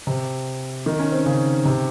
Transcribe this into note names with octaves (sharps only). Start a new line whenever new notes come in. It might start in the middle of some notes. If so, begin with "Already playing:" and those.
C3
D#3
C#4
C4
C#3
C3